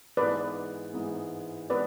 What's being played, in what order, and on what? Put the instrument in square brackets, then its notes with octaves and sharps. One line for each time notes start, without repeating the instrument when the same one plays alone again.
[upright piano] G#2 E3 G#3 B3 [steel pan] B4 D5
[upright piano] G#2 E3 G#3 B3
[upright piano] G#3 B3 [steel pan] B4 D5